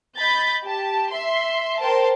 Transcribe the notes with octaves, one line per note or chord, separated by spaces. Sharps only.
D#5 B5 G6 A6
G4 A5
E5 C6
A#4 C5 G5 A5 C6